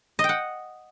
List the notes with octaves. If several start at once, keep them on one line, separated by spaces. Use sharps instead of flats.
D#5
G5
F#5